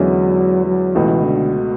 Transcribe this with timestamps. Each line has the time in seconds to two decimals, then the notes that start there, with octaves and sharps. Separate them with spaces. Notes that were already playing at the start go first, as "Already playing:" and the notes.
Already playing: E2 D3 F#3 G#3 C#4 E4
0.66 F#3
0.95 C#2 B2 E3 A3
1.24 D3